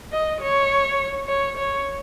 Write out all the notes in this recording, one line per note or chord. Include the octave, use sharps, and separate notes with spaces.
D#5
C#5
C#5
C#5